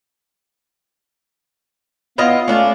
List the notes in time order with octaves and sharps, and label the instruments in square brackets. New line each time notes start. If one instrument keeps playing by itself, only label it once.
[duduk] B3 [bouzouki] E4 F4 D#5 [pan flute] F5
[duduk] A3 [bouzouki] C#4 D4 F4